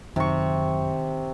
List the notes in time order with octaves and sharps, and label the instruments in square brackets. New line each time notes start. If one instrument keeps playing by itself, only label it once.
[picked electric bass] F#2 [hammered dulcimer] C3 C#6 [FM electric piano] D#3